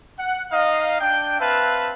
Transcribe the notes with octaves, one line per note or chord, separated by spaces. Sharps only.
F#5
D#4 D#5 F5
D4 G5
C4 B4 E5 F5 A5